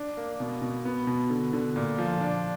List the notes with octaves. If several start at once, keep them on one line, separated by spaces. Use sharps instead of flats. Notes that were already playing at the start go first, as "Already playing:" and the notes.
Already playing: D4
A#3
B2
B2
B3
B2
D3
D3
A#2
F3
D4